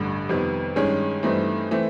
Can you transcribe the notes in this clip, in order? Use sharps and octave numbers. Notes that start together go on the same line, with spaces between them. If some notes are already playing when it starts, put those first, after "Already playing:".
Already playing: A1 G2 D3
F2 C3 D#3 G3 B3
G2 D#3 G#3 C#4
G2 E3 A3 C4 D#4
E3 A3 C4